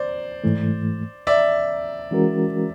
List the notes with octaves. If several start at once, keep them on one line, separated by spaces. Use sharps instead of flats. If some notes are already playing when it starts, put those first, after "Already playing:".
Already playing: C5 D5
G#2 E3 A3
D5 E5
E3 G#3 C#4 F#4 A#4